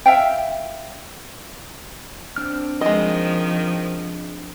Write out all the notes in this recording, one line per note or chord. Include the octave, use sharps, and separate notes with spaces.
E5 F5 G5
C4 D4 F6
D#3 F3 G#3 D#5